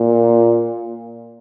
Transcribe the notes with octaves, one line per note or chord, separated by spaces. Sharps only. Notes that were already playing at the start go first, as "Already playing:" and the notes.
Already playing: A#2